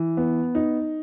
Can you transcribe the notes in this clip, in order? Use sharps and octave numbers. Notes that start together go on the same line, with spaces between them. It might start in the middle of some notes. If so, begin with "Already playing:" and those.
Already playing: E3
B3
D#4